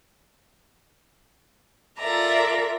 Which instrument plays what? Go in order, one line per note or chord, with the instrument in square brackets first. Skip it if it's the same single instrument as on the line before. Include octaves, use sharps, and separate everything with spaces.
[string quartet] F4 A4 A#4 D5 E5 A#5